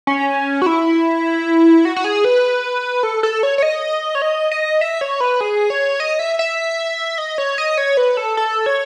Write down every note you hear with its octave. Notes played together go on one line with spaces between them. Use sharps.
C#4
F#4
E4
F#4
F#4
G#4
B4
A4
A4
C#5
C#5
D#5
C#5
D#5
D#5
E5
C#5
B4
G#4
C#5
D#5
E5
E5
D#5
C#5
D#5
C#5
B4
A4
A4
C#5